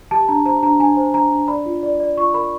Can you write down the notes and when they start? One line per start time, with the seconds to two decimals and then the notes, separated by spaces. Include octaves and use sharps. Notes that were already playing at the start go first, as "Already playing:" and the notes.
0.11 G4 A5
0.28 D4 A#5
0.46 C5 A#5
0.63 D4 A#5
0.79 D4 G#5
0.97 C5
1.14 D4 A#5
1.31 D4
1.48 D5 B5
1.66 F4
1.83 D5
2.00 D5
2.17 F4 C#6
2.34 A#4 B5